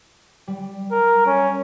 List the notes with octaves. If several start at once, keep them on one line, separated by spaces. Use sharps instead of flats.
G3
A#4
C#4